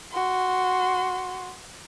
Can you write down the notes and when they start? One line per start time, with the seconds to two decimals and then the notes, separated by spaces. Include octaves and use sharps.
0.12 F#4 C6